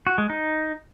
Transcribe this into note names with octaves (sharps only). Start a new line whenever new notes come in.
F#4
G#3
D#4